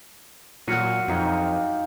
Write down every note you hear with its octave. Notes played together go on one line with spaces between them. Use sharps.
A#2 F#3 F#4 F6 C#7 D#7
F2 D#4 F4 G4